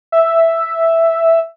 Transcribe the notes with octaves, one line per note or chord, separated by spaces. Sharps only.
E5